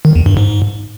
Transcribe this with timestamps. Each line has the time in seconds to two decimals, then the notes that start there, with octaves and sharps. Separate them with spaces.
0.05 D#3
0.15 E2
0.26 G2
0.37 G#2